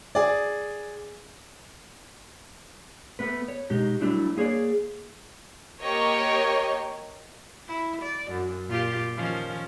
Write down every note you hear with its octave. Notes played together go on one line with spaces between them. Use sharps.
G#4 D5
A3 B3 B4
C#5
B2 G#3 D#4 G4
F#3 G3 A3 D4 E4
A#3 G#4 C#5 D5
A#3 G4 C#5 D#5 C#6
E4
D5
F#2
A#2 F4 G4
D#3 F3 C#4